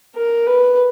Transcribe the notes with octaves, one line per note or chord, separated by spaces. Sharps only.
A#4
B4